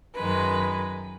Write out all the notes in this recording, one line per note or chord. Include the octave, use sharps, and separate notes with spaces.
F#2 D#3 G#3 B4